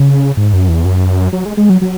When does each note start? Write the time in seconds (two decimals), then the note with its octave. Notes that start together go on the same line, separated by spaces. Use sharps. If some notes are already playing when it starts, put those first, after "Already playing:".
Already playing: C#3
0.37 G#2
0.53 F#2
0.69 E2
0.85 F#2
1.33 F#3
1.45 G#3
1.57 G#3
1.70 F#3
1.81 F#3